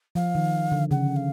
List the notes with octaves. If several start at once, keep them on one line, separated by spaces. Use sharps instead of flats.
F3 F5
D#3
D3
C#3 F#5
F5